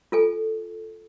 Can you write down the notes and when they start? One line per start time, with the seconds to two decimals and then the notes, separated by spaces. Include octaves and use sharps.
0.12 F4 A4 G#5